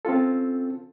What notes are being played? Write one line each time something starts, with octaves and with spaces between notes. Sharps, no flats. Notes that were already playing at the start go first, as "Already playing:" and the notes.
C4 C#4 F4 A4